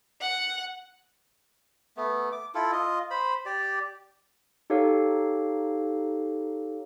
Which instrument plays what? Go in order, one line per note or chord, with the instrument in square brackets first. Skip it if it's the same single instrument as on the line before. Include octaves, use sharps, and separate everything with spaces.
[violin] F#5
[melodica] A3 B3
D6
E4 F4 A4
F4 D#5
C5 B5
G4 D5
[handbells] D#4 G4 A4 C#5 F5